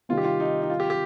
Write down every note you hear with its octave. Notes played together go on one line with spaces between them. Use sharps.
C3 D#3 G3 C4 F4
G4
F4
D#4
D#4
F4
G4
G4